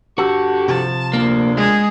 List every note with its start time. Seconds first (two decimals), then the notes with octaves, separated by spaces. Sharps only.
0.18 G2 D3 F#4 G4 A4
0.68 C3 F3 A5
1.14 D2 A#2 A#3 D4
1.57 G#3 G#4